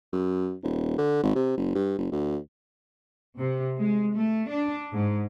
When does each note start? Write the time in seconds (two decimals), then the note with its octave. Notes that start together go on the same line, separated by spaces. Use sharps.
0.12 F#2
0.63 D#1
0.98 D3
1.23 G#1
1.36 C3
1.57 F#1
1.75 G2
1.98 F#1
2.12 D2
3.38 C3
3.79 G#3
4.15 A3
4.50 D4
4.93 G#2